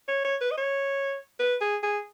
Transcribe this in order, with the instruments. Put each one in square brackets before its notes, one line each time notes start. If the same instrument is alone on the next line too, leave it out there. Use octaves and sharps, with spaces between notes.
[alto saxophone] C#5
C#5
B4
D#5
C#5
B4
G#4
G#4